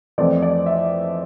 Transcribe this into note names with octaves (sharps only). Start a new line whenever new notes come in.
F2 E3 A3 C4 D5
D5
E5